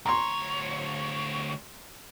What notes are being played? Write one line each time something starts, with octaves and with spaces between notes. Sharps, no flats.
D2 C#5 A#5 C6